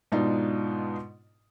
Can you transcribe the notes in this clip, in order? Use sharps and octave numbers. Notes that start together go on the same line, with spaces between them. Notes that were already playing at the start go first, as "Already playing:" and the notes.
G#2 B2 D4 D#4 F4